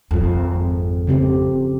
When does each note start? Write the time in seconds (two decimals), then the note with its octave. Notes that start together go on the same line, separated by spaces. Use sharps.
0.11 G#1 F2
1.07 C#3 C4 G4